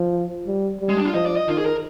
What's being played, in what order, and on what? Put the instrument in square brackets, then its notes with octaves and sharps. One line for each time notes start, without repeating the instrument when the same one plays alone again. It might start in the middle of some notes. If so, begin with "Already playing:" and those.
Already playing: [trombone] F3
G3
G3
[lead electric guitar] G#3
D4
F4
[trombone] F3 [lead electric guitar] D#5
[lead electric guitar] D5
D#5
[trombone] D#3 [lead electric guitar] F4
[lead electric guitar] G#4
A#4